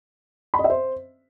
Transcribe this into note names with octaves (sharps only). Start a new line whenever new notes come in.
B5
D#5
E5
C5